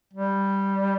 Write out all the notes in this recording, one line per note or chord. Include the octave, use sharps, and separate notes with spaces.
G3